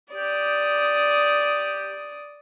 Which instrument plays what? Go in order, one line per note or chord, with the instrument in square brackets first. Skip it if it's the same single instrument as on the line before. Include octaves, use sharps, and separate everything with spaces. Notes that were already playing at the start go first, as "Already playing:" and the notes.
[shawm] G4 [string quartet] D5 D#6